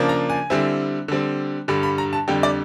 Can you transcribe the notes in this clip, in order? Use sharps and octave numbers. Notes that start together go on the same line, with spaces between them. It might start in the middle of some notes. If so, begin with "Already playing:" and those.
Already playing: C#3 F3 A#3 D4
A#5
G#5
D3 G3 C4 E4
D3 G3 C4
G2 D3 G3 B5
B5
A#5
A5
F2 D3 G3 G5
D5